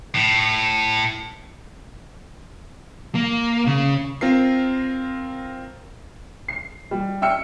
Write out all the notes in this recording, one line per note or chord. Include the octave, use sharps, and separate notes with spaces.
A2
A#3
C#3
C4 F4 A#4 C7
C7
G3
E5 G5 E6 F6 C#7